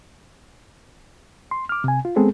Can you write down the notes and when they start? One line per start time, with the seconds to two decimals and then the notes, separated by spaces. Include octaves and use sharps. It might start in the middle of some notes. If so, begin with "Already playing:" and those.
1.51 C6
1.69 D6 F6
1.84 C3 G#5
2.05 F4
2.16 G#3 B3 C4 G#4 A4